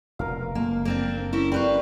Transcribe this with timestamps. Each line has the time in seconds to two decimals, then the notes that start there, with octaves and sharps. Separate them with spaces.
0.19 F1 B2 A#4 F5
0.55 F#1 A#3
0.85 A#3 C4 D4
1.33 C4 C#4 E4
1.52 G3 C4 B4 F5 C#6